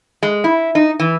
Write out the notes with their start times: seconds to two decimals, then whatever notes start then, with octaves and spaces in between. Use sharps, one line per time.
0.23 G#3
0.44 E4
0.75 D#4
1.00 E3